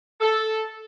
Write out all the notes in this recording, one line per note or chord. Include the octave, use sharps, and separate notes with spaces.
A4